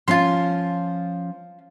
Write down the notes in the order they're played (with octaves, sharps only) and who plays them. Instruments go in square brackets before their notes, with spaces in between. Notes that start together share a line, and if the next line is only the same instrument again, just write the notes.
[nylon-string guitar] F3 C#4 [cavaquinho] F4 C6